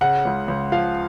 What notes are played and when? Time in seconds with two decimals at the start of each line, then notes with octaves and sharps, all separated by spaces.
0.01 C#3 F#5
0.25 C#2
0.48 C#2
0.72 F3 F5